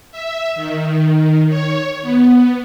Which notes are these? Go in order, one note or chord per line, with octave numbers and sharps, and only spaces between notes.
E5
D#3
C#5
B3